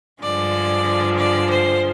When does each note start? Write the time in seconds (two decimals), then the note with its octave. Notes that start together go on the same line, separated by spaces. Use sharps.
0.23 G2 D3 F3 G#3 D5
1.18 D5
1.49 C5